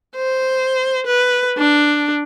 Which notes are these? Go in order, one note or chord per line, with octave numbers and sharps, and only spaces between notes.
C5
B4
D4